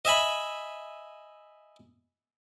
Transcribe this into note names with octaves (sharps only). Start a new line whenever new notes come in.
D#5 E5 G#5 B5